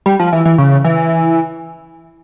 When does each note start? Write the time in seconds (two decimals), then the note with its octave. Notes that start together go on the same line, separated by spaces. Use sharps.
0.06 G3
0.19 F3
0.33 E3
0.45 E3
0.58 C#3
0.84 E3